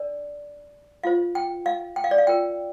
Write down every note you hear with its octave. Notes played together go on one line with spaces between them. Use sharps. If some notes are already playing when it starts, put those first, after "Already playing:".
Already playing: D4 A#4 D5
F4 C5 F5
G5
F5
G5
F5
D5
F5
F4 A#4 G5